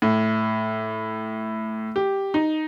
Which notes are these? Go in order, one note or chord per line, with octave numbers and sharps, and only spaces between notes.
A2
G4
D#4